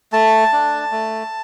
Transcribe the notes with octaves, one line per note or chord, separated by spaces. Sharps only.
A3 A5
D4
A3